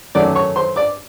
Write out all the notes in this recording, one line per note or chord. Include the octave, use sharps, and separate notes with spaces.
F#2 D#3 F#3 A3 C#4 D5 D6
C#5 C#6
C5 C6
D5 D6